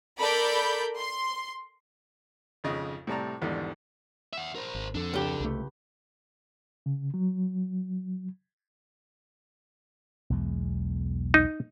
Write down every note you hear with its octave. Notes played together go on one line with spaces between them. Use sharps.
A4 A#4 D5 B5 G6
C6
G#1 F2 C#3 D#5
A2 C3 G3 A5 A#5
G#1 E2 G#2 D3 D#3 G3
E5 F#5
A#4 C5
G#1
F2 D4 A4
C#2 G4
C2 A3
C#3
F#3
B1 E2 G#3
D#4